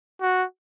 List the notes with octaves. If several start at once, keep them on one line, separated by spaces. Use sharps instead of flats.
F#4